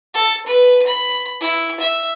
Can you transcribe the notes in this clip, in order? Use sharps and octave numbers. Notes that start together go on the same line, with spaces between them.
A4
B4
B5
E4
E5